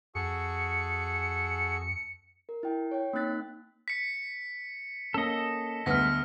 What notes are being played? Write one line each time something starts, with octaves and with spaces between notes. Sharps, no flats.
F2 F#4 G#4 A4 C#7
A#4
E4 G5
C#5 G5
A#3 C4 D#4 F#6 A6 B6
B6 C#7
A#3 C#4 A4 D#5
D2 G3 B3 F6 A#6 B6